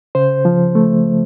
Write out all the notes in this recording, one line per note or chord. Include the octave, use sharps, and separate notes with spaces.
C#3 C5
F3
A3